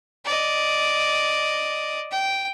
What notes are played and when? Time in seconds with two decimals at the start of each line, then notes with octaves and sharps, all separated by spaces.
0.25 D5 D#5
2.11 G5